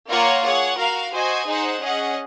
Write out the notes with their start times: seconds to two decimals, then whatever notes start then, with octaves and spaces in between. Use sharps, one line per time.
0.10 A#3 F4 A#4 C#5 F#5
0.44 G#4 C#5 F#5
0.77 F#4 A#4 F5
1.12 F#4 C5 D#5 G#5
1.46 D#4 G#4 C5 F#5
1.80 C#4 G#4 D#5 F#5